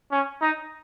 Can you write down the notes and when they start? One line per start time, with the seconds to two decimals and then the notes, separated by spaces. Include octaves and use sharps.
0.11 C#4
0.41 D#4